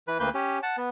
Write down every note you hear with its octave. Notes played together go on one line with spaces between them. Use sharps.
E3 B4
D2 A#3 B4 G6
C#4 G4
F#5 A5
B3